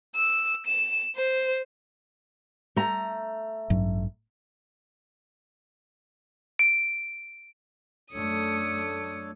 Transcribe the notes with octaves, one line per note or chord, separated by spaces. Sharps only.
E6
E7
C5
A3 A#5
A1 G2 F#3
D7
F#2 A3 D4 A4 C#5 D#6 C#7